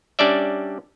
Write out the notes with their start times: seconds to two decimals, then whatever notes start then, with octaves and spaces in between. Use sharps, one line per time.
0.19 G3 C#4 D4 D5 E5